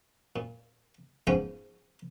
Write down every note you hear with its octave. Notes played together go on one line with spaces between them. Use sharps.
A#2
G#2 F3 B3 C#4 G5